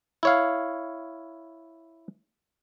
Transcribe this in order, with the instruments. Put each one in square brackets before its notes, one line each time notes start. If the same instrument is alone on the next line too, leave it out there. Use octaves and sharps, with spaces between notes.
[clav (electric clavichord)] E4 C#5 F5